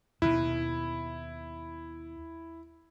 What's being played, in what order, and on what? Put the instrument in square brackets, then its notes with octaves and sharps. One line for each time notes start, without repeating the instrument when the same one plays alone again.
[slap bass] D#2 B2 [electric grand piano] E4